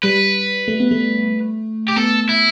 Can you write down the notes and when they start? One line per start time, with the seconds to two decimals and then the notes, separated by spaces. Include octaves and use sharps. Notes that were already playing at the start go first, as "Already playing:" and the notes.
0.03 G3 B4
0.68 A3
0.80 B3
0.91 A3
1.88 G4
1.96 B3 A4
2.29 E4